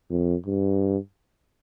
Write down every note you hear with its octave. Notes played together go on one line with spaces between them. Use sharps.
F2
G2